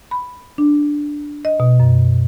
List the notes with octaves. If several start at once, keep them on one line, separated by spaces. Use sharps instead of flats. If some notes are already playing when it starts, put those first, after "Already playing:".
B5
D4
D#5
B2
F#2